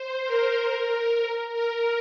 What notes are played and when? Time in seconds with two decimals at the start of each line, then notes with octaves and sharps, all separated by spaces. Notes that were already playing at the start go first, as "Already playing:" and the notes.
Already playing: C5
0.25 A#4
1.52 A#4